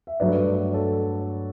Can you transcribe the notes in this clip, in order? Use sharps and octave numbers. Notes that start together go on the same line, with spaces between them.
E5
G2 F#3 A3 B4 D5
A4 C#5